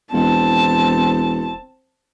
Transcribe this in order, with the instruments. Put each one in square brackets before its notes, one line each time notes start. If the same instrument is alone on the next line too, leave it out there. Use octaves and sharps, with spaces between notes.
[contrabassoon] E1 [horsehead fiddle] C4 A5